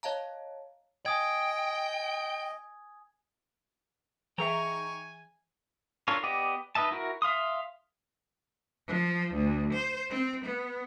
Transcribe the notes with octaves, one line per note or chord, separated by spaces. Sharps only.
C#5 D#5 F5 A5 A#5
D#5 G5 G#5 D#6 G#6
E3 D#4 G#4 E5 G5 G#5 A#5 C#6
D4 F4 A4 A#4 C#5
B3 G4 D5 D#5
D#4 B4 D#5 E5 A5
E4 F#4 A#4
E5 F5 C6 D#6
F3
D2
C5
C4
B3